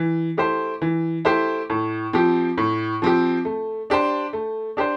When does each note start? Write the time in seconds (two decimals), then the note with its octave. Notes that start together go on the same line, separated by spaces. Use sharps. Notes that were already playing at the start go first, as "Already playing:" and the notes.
Already playing: E3
0.37 A3 E4 G4 C5
0.82 E3
1.25 A3 E4 G4 C5
1.70 A2
2.13 F3 C4 G4
2.58 A2
3.02 F3 C4 G4
3.45 A3
3.90 D4 G4 C5
4.33 A3
4.77 D4 G4 C5